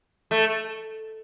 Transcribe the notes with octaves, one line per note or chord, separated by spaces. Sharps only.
A3